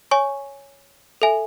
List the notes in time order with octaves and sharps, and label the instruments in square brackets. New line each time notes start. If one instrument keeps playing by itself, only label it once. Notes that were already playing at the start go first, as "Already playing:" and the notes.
[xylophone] C#5 G#5 C#6
A4 E5 G#5